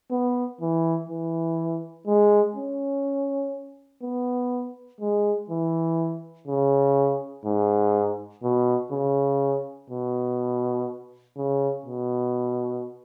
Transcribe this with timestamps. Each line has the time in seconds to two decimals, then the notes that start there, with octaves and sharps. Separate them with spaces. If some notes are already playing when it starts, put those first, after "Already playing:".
0.11 B3
0.61 E3
1.10 E3
2.07 G#3
2.56 C#4
4.02 B3
5.00 G#3
5.50 E3
6.48 C#3
7.45 G#2
8.43 B2
8.92 C#3
9.90 B2
11.37 C#3
11.85 B2